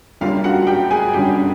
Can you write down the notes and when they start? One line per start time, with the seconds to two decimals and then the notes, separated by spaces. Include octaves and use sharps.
0.21 F#1 F#2 D3 G3 F4 F5
0.44 F#4 F#5
0.67 G4 G5
0.91 G#4 G#5
1.13 F#1 F#2 D3 G3 G4 G5